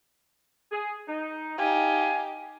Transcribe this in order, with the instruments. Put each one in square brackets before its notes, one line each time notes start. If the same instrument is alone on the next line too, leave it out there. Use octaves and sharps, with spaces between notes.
[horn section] G#4
D#4
[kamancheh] D#4 G4 [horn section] F5 G#5